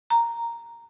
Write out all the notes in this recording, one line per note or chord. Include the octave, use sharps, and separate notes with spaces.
A#5